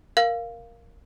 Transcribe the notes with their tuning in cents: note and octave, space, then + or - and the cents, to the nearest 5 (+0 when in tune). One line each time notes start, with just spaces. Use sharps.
A#4 +0 F5 +0